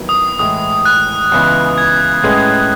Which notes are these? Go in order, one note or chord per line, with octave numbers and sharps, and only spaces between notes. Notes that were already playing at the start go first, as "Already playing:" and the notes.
Already playing: D#2 D#3 F#3 B3 E4
D#6
A2 E3 G#3 D#6
F#6
C#2 C#3 E3 B3
G#6
A2 G#3 C#4 G#4 B4